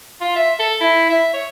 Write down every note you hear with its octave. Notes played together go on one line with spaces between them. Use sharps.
F4
E5
A4
E4
E5
C#5